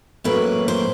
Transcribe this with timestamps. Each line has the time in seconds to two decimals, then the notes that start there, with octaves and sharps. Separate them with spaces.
0.24 A2 F#3 A#3 C#4 B4
0.68 C5